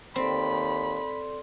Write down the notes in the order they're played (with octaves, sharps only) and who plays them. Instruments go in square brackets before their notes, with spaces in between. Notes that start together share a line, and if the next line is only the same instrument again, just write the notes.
[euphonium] D#2 [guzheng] C4 [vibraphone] A4 D5 C6 [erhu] B5